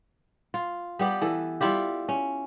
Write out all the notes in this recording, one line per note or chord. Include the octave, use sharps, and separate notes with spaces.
F4
G3 B3 G4
E3 A4
G3 E4 F4 G4
C#4